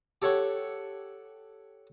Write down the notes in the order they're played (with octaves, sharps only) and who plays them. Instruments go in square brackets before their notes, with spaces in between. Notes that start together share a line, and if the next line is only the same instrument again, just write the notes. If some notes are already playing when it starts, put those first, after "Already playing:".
[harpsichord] G4 A4 C#5 F#5 C#6